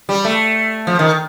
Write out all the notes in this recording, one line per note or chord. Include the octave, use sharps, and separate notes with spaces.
G3
A3
F3
D#3